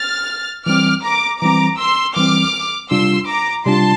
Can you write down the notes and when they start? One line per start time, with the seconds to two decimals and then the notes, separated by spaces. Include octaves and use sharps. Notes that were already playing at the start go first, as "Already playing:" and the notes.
Already playing: F6 A6
0.66 E3 G3 C4 D6 F6
1.04 A#5 D6
1.41 E3 G3 C4 A#5 D6
1.79 C6 E6
2.16 E3 G3 C4 D6 F6
2.91 C3 G3 D4 F4 C6 E6
3.28 A#5 D6
3.66 C3 G3 D4 F4 A5 C6